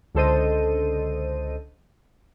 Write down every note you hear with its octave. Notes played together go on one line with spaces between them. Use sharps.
C#2 D3 A4 C5 D#5 D#7